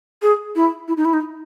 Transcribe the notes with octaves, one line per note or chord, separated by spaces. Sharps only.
G#4
E4
E4
D#4
E4
D#4